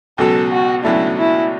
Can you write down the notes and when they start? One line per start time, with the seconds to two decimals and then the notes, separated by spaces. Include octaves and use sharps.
0.18 C#2 B2 F#3 A4
0.52 F#4
0.84 C#2 B2 F#3 A3 D4 E4
1.18 E4